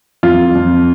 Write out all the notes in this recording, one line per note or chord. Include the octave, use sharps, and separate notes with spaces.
F2 F4
F2